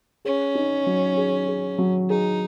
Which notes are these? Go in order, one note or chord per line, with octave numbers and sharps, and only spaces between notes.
C#4 G#4
D#4
F#3
G#4
G#4
F#3
D#4 G#4